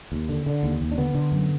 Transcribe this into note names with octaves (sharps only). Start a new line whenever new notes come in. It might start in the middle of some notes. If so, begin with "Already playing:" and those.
D#2
D3
D3
D#2
D#2
D4
D3 B3
D3
F#2